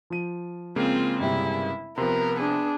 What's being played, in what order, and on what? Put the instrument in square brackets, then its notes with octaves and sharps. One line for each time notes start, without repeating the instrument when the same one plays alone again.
[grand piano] F3 D#7
[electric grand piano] C#3 G#3 A#3 [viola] C4 F4
[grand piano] G1 C3 G3 [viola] E4
[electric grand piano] C3 F3 [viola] B3 [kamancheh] A#4 [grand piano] C6
[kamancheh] D4 G#4